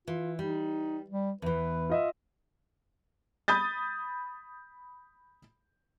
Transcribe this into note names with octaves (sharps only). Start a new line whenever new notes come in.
E3 F4
G3 D#4
G3
E2 E3 B4
F4 D#5 E5
B5 D#6 G6 A6